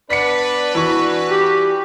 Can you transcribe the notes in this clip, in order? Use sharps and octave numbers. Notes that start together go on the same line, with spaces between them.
B3 D4 B4 D5 B6 C#7
E3 F#4 C#6
G4